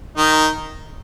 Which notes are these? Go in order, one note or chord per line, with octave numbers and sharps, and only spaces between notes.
D#3 D#4